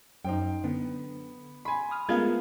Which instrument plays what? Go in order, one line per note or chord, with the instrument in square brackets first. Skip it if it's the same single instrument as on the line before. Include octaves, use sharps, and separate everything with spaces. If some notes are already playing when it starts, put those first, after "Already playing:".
[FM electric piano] F#2 [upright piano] D#4 C5 G5
[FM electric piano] D3 [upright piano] B3
[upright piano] G#5 C6 [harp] B5
[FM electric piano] D#6 F6
[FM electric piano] G#3 A3 A#4 [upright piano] B3 G#6 [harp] F4 F5